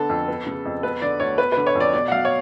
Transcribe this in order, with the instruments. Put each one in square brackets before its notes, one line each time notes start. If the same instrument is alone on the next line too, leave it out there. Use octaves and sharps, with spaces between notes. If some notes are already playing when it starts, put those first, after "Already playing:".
Already playing: [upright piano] D3 B3 A4
F2
B3
C#3
F2
B3 B4
D3 D5
D2 C#5
B3 B4
D3 B4
C#5
F2
D5
B2 D5
F#5
F#3 F5
C#5